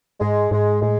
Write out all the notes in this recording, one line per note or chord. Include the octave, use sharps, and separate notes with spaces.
G#2 G#3
G#2 G#3
A2 G#3